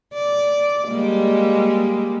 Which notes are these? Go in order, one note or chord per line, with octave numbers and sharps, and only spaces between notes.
D5
G3 G#3 A#3